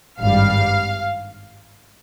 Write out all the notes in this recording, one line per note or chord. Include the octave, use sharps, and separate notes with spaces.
G#1 G2 G3 F5